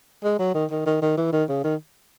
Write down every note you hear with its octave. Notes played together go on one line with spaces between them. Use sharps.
G#3
F#3
D#3
D#3
D#3
D#3
E3
D#3
C#3
D#3